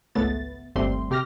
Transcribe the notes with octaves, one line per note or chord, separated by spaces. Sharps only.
G#1 C#2 A3 B3 A6
G1 D#2 G3 A3 C4 C6
C3 G4 F6 A#6